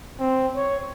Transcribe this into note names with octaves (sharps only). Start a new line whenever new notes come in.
C4
C#5